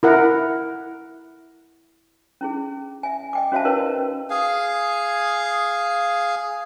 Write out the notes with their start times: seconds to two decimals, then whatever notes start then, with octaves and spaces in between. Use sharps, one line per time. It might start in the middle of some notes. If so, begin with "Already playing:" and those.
0.03 E4 A#4 F#5
2.41 C#4 E4 G#4
3.03 E5 G#5
3.33 D#5 G5 D6
3.52 C#4 F#4 C5 E5 F5 A5
3.65 D#4 E4 A#4 B4 C#5 D#5
3.98 C#4
4.30 G#4 F5 G#5